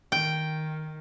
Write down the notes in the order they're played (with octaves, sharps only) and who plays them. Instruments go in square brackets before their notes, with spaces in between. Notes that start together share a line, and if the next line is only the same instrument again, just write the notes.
[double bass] D#3 [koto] G5